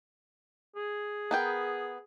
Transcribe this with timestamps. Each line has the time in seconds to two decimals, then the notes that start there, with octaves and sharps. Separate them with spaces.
0.76 G#4
1.31 B3 A#4 G5